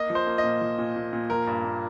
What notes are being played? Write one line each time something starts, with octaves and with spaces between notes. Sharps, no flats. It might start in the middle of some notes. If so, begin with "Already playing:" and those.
Already playing: A#3 D#5
F3
C5
A#3
D#5
A#2
F3
A#2
A#2
A#2
F3 A#4
G2
A#3